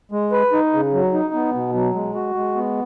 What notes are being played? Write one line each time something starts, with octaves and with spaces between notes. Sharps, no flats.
G#3
B4
D#4
C#3
F#3
D#4
B3
B2
F#3
G#3
F#4
G#3
B3